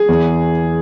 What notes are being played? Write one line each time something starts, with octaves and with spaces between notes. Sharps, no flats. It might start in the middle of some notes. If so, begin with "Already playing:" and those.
Already playing: G#4
E2